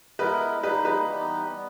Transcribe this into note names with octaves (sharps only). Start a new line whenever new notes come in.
G#3 B3 E4 A#4 B4 D#5
G3 A#3 D#4 G#4 B4 D#5
B4 D#5
E3 G3 B3 D#4 G4
G3 B3